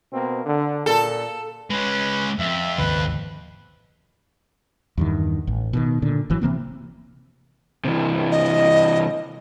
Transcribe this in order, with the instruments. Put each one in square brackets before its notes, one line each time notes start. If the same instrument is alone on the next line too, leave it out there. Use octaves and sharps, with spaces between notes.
[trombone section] B2 A#3 C4
D3
[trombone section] A#2 [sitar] A4
[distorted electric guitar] G#3 C#4 [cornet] B4
[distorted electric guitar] F2 [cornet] E5
[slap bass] G#1 D#2 C#3 [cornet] B4
[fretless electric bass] E2 G2 D#3
A1
B2 D3 D#3
A#2 D3
G#1 E3 F#3
C3 E3 A#3 C4
[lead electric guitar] C3 E3
[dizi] D#5